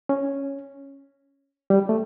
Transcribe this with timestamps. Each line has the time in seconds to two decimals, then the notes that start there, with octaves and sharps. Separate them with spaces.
0.09 C#4
1.70 G3
1.89 A3